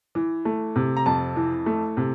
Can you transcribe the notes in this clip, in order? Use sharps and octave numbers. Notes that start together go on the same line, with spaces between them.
E3
A3
C3
A#5
F2 A5
E3
A3
C3